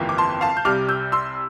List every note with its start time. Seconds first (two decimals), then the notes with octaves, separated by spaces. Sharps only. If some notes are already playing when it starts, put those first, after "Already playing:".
Already playing: G1 F2 E3 A#3 F4
0.09 D6
0.18 A5 C6
0.41 F5 A5
0.57 G6
0.65 C2 C3 G3 D6 F6
0.88 E6 G6
1.12 C6 E6